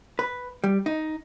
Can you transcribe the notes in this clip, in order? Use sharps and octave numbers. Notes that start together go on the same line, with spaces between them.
B4
G3
D#4